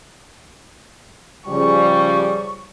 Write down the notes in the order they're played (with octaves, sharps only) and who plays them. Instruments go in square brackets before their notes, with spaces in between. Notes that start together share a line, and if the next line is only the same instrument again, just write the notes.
[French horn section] C#3 F3 G3 [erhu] C#6